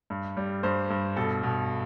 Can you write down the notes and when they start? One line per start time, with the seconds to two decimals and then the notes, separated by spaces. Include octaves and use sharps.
0.10 G2
0.37 G3
0.63 G2 C5
0.90 G2
1.16 B2 A4
1.43 B2